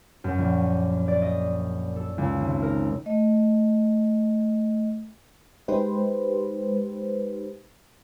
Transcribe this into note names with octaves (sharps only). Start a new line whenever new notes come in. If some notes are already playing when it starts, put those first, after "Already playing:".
F#2
A#1
D5
D#5
A4
C#2
G#1
A#4
A3 D#5
G#3 D#4 G4 B4 C5